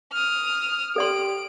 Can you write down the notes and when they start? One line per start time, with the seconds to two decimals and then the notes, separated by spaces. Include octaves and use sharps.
0.13 D#6 F6
0.96 G4 A4 D5 C6 D7